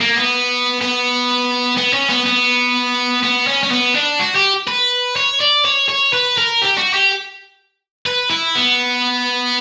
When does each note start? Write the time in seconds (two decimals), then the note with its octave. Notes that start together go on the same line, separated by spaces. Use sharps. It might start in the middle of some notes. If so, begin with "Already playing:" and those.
0.01 A#3
0.16 B3
0.81 B3
1.77 B3
1.94 C#4
2.10 B3
2.26 B3
3.23 B3
3.47 C#4
3.63 C#4
3.71 B3
3.95 D4
4.19 F#4
4.35 G4
4.68 B4
5.16 C#5
5.40 D5
5.65 C#5
5.89 C#5
6.13 B4
6.37 A#4
6.61 G4
6.78 F#4
6.93 G4
8.06 B4
8.31 E4
8.55 B3